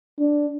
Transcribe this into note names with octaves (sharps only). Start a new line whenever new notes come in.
D4